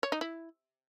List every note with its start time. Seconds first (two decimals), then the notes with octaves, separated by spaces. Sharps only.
0.03 C#5
0.12 D#4
0.21 E4